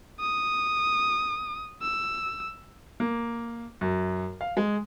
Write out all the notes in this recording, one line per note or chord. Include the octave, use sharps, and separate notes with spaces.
D#6
E6
A#3
F#2
F5
G#3